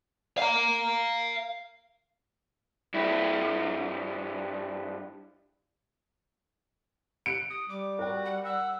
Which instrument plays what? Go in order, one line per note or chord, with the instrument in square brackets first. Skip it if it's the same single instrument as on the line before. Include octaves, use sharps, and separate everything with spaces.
[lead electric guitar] F5 A#5
[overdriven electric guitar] G2 E4
[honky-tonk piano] F#6 C#7 D7
[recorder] D#6
[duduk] G3 [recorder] D6
[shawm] F#4 [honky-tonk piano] A#4 G5
[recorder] F#5
[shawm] F#5 [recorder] E6